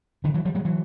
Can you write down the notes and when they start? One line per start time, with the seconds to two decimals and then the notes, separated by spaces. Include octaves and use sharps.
0.24 D3 E3
0.34 E3 F#3
0.45 F3 G3
0.55 F#3 G#3
0.65 E3 F#3